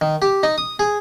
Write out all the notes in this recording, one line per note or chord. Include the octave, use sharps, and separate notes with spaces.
D#3
G4
D#4
D#6
G#4